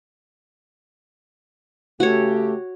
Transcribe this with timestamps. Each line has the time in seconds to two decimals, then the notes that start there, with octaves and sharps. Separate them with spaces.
2.00 C#3 A3 F#4 G4 C#5